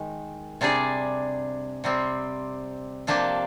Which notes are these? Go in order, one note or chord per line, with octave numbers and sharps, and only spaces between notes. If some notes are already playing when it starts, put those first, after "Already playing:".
Already playing: D#3 G#3
C3 G3 D4 G#4
C3 G3 C4
C3 F3 A#3 D4 G4